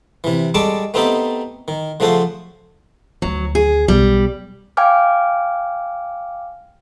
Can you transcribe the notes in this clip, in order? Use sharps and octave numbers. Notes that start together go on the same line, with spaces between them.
C3 E3
G3 G#3 A4 A5 C#6 D6
A3 B3 C4 D#4 G4 A4
D#3
C#3 F3 A3 F#4 A4 C5
D2 D#3 F#3
G#4
B1 G3
F5 G5 G#5 D6 F6